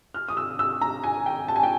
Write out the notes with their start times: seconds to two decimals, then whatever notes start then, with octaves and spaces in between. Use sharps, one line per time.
0.14 F6
0.28 D#6
0.37 E6
0.59 E6
0.81 A#5
1.04 G#5
1.26 G5
1.48 A5
1.56 G#5
1.63 G5